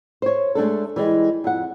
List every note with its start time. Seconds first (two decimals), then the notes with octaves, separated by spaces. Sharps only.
0.22 C5 C#5
0.55 G#3 A3 D4 A4
0.96 E3 G3 G#3
1.44 F2 F#5